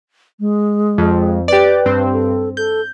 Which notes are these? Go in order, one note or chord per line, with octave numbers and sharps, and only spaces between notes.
G#3
F2
G4 B4 D5
G2 C4
A4
A4 G6